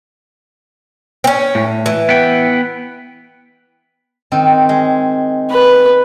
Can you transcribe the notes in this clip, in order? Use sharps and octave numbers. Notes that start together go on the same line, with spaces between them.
C4 C#4
A2
E3
B3 G5
D#3 C4
G#3
B4